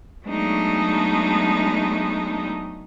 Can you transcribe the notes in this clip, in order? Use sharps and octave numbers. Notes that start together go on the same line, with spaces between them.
F#3 G#3 A3 B3 D4 D#4